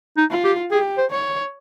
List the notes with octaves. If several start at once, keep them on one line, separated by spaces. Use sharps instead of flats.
D#4
F4
G4
G4 G#4
C5
C#5